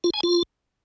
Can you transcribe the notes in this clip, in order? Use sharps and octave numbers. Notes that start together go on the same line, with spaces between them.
F4
G#5
F4